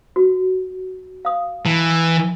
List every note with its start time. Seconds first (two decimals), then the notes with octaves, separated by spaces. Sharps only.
0.16 F#4
1.25 F5 D#6
1.66 E3 A5